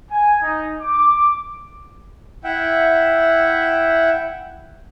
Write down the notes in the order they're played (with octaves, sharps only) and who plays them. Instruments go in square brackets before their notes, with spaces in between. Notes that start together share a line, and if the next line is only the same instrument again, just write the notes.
[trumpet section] G#5
D#4
D6
[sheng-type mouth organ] E4 E5 F#5 G5